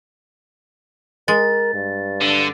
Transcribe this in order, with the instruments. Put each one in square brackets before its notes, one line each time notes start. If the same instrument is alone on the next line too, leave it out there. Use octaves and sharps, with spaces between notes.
[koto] G#3 [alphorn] A#4 [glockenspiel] A6
[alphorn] G2
[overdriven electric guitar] D3